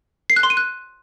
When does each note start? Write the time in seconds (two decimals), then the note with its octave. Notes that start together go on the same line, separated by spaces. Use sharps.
0.30 C7
0.36 F#6
0.43 C6
0.50 D#7
0.57 F#6